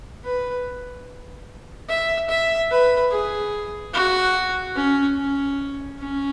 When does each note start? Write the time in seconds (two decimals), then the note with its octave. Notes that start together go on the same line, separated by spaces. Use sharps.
0.24 B4
1.89 E5
2.29 E5
2.71 B4
3.11 G#4
3.94 F#4
4.76 C#4
5.17 C#4
5.99 C#4